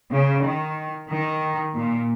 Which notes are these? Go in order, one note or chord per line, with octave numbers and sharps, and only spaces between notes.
C#3
D#3
D#3
A#2